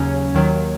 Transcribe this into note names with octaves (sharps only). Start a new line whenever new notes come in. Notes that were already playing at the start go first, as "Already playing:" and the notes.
Already playing: D#2 C#3 F#3 C#4 C#5
D#2 D#3 F#3